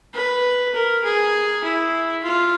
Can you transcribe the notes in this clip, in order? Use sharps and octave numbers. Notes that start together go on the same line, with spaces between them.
B4
A#4
G#4
E4
F4